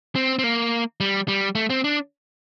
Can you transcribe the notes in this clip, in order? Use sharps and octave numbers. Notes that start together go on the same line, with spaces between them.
C4
C4
A#3
G3
G3
A3
C4
D4